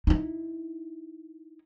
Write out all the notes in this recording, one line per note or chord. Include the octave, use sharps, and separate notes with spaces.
D#4 E4